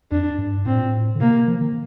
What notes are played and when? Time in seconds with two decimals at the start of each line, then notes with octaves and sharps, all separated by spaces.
0.11 F2 D4
0.38 G2
0.65 A2 C4
0.76 A#2
0.87 A2
1.15 D3
1.20 C3 A#3
1.47 F3
1.61 D#3